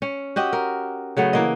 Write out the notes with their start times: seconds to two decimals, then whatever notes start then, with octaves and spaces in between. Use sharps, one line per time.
0.02 C#4
0.36 F#4 G4 D#5
0.53 A#4
1.17 C#3 F#3 A3 B3
1.33 E3 A#3 D#5